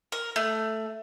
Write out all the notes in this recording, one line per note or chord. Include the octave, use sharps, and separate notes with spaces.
A#4
A3